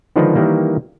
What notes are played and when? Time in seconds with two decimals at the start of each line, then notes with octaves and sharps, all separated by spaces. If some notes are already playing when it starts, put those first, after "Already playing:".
0.16 D3 D#3 F3 G#3 D4 B4
0.35 D#3 E3 G3 A#3